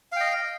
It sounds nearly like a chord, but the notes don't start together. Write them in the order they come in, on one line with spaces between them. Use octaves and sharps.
F5 G5 D#5